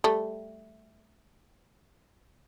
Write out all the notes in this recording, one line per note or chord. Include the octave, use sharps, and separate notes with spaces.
G3 A3